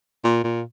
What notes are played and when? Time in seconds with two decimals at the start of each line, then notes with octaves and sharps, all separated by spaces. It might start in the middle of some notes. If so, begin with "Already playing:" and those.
0.25 A#2
0.44 A#2